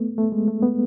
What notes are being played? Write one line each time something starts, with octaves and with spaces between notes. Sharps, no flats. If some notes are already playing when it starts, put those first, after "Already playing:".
Already playing: A3 B3
A3
G#3
A3
B3